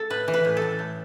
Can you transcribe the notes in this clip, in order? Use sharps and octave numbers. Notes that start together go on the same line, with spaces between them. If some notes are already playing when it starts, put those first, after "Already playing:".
Already playing: A4
A2 B4
E3
B4
A2
A4
A2
A2